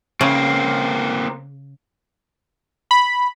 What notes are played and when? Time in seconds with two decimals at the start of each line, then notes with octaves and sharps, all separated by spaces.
0.21 C#3 A#3 C4
2.91 B5